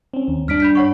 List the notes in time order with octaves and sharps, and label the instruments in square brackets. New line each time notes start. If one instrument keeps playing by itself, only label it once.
[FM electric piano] C4 C#4
D#2
[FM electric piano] G2 D4 [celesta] F6 B6 D7
[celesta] B5 G6 B6
C#5 F#5 C#6